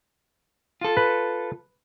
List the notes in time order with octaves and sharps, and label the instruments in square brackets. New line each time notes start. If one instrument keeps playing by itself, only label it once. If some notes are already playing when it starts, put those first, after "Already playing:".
[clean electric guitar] F4 A4
[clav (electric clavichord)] B4